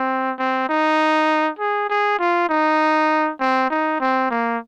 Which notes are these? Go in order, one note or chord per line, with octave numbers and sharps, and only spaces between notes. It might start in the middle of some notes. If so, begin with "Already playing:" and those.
Already playing: C4
C4
D#4
G#4
G#4
F4
D#4
C4
D#4
C4
A#3